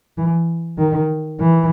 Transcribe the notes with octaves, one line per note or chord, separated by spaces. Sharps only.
E3
D#3
E3